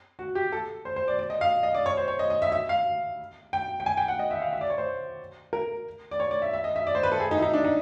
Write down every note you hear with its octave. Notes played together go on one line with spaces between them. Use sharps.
F#4
G4
A4
C5
C5
D5
D5
D#5
F5
D#5
D5
C#5
C5
C#5
D#5
D#5
E5
E5
F5
G5
G5
G#5
G5
F#5
D#5
E5
F5
E5
D5
C#5
C5
A#4
D5
C#5
D5
E5
E5
D#5
E5
D5
C5
B4
A4
G#4
D#4
E4
D#4
D4
D#4